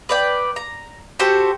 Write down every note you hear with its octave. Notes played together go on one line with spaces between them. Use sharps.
B4 D5 G5
A#5
F#4 G4 A4 C5